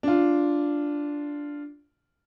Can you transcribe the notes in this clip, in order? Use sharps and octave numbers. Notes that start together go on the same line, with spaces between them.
D4 F4